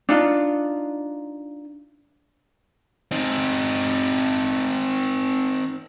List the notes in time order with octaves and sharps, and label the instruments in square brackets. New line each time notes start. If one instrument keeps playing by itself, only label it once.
[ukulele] D4 D#4 F4
[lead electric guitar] C4 D#4